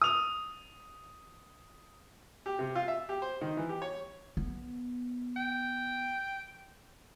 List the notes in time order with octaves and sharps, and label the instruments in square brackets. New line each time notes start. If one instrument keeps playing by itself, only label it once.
[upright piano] D#6 F7
[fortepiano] G4
C3
F4
E5
G4
C5
D#3
E3
G4
C#5
[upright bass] B3
[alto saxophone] G5